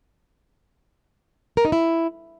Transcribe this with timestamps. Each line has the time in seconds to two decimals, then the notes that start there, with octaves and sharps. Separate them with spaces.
1.57 A#4
1.65 D#4
1.72 E4